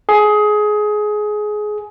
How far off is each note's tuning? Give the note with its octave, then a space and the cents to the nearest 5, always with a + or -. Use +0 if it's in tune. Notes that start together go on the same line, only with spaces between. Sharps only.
G#4 +20